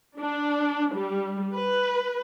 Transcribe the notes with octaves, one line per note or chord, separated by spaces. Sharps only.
D4
G3
B4